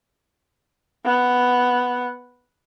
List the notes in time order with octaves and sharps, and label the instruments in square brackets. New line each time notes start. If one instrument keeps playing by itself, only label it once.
[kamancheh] B3 F#5